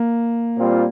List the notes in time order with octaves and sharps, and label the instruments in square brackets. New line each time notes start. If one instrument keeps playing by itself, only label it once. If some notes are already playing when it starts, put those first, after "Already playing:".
Already playing: [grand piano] A#3
[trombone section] A#2 G3 C4 F4